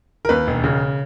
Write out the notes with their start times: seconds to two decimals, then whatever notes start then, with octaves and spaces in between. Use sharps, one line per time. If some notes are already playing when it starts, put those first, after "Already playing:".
0.25 A#4
0.29 D#2 B4
0.47 E1
0.64 C#3